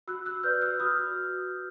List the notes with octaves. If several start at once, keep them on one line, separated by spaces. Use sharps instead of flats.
F#4 E6 F#6
E6 F#6
B4 D5 F6 G6
E6 F#6
F#4 D#6 F6